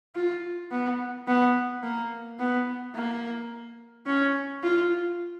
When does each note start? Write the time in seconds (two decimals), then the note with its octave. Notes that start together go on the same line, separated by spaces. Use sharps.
0.16 F4
0.71 B3
1.28 B3
1.83 A#3
2.40 B3
2.95 A#3
4.06 C#4
4.63 F4